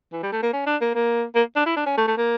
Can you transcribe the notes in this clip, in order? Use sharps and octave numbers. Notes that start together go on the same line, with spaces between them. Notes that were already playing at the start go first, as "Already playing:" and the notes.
E3
G3
A3
A#3
C#4
D4
A#3
A#3
A#3
D4
E4
D4
C#4
A3
A3
A#3